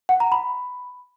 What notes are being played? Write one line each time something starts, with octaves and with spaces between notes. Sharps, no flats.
F#5
A#5
B5